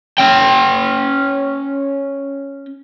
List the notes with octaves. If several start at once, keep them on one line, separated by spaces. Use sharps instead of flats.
C#4 G5